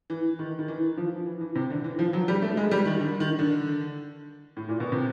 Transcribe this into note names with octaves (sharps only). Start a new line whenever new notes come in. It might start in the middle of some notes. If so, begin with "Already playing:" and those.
E3
D#3
D#3
E3
F3
E3
E3
C3
D3
E3
F3
F#3
G3
A3
G#3
G3
D#3
D3
D#3
D3
A2
A#2
B2
C3